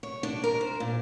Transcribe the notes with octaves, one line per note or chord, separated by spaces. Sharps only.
C#5
D4
A#4
C5
A#2